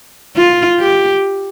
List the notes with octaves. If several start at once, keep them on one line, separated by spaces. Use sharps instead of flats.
F4
G4